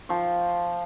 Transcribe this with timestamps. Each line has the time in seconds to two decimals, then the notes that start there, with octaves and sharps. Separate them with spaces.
0.09 F3 G5 C#6